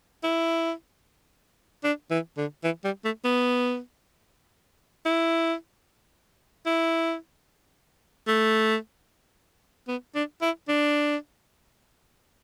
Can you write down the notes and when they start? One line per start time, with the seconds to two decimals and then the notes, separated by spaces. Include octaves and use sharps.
0.23 E4
1.84 D4
2.11 E3
2.37 D3
2.64 E3
2.84 G3
3.05 A3
3.24 B3
5.05 E4
6.66 E4
8.27 A3
9.88 B3
10.15 D4
10.42 E4
10.68 D4